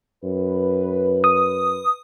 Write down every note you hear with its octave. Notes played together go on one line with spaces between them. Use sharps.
F#2 B4
D#6